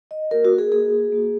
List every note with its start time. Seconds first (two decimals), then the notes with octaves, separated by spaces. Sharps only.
0.11 D#5
0.31 A#3 F#4 A#4
0.45 F#4
0.58 G#4
0.72 A#3 F#4 G#4
1.12 A#3 F#4